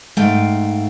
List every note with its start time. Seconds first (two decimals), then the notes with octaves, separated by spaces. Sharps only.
0.17 G#2 A3 F5 G5